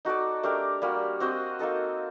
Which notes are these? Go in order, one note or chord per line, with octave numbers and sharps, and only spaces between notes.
D#4 F#4 A4 D5
A3 D4 G4 A#4
G3 A#3 F#4
C4 F#4 C5 D#5
A#3 D#4 A4 D#5